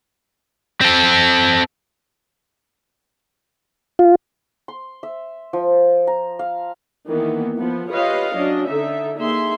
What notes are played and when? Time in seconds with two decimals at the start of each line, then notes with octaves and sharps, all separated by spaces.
0.81 C4 A4
3.99 F4
4.68 C6
5.03 E5
5.53 F3
6.07 A#5
6.39 F5
7.07 D#3 E3 A#3 B3
7.59 F3 B3
7.91 F4 G4 B4 C#5 D#5 F5
8.35 F#3 C#4 D4 D#5
8.67 D3 D#4 A4 E5
9.17 A#3 D#4 G#4 E5 C6